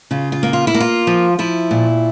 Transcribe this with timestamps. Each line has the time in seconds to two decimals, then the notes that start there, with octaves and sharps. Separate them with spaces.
0.11 C#3 F4
0.32 F4
0.43 A#3
0.53 F4
0.67 E4
0.74 A#3
0.80 F4
1.07 F3
1.39 F3 E4
1.71 A#2